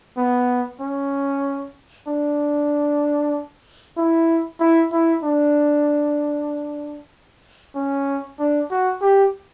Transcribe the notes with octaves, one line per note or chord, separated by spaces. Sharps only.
B3
C#4
D4
E4
E4
E4
D4
C#4
D4
F#4
G4